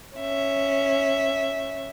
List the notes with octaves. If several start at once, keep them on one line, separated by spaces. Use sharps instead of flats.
C#4 E5